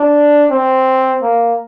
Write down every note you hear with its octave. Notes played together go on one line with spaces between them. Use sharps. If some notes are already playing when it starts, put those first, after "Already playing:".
Already playing: D4
C4
A#3